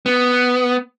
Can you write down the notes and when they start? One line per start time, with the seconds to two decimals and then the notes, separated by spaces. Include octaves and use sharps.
0.06 B3